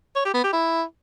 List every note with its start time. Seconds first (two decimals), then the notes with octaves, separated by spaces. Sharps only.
0.16 C#5
0.25 G4
0.34 B3
0.44 G4
0.53 E4